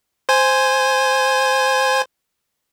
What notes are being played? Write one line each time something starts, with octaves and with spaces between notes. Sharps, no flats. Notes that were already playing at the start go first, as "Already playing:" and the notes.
C5 G#5